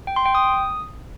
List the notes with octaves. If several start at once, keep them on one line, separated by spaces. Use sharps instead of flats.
G5
C6
G5
D#6